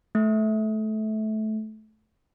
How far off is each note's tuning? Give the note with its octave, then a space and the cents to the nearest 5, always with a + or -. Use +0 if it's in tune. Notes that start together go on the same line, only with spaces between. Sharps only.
A3 -20